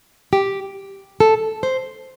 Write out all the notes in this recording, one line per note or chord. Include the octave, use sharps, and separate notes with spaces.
G4
A4
C5